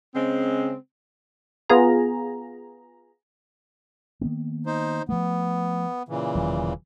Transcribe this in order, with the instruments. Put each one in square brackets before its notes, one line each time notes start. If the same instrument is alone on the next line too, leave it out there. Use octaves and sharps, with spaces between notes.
[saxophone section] C#3 G#3 C4
[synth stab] B3 F4 G#4 A#5
[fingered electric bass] D#3 A#3 B3
[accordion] D#4 C5
[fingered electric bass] F3 A3 [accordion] B3
[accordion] A#2 C#3 E3
[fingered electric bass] E1 D#3 F#3